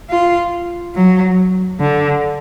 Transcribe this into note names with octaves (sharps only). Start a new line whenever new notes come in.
F4
F#3
D3